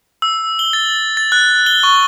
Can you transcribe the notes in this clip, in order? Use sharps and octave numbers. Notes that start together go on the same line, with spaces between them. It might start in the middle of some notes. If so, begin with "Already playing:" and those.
E6
G7
A6
A6
F#6
G7
C#6